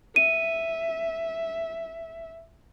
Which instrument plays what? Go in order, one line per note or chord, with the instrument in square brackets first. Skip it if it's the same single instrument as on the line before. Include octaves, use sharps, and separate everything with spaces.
[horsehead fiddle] E5 [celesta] D#7